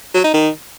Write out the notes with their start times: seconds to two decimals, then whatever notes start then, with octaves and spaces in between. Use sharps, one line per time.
0.14 F#3
0.24 D#4
0.34 D#3